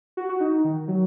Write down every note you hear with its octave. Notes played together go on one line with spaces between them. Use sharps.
F#4
F#4
D#4
D#3
F#3